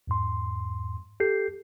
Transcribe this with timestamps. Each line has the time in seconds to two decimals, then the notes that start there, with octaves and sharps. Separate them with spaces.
0.07 E2 G#2 C6
1.20 G4 A4 G6 C7